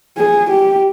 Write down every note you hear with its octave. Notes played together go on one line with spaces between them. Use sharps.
G#4
G4